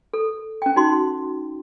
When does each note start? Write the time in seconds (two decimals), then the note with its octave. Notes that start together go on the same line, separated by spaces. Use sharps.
0.13 A4
0.62 C#4 G5
0.76 D#4 F#4 C6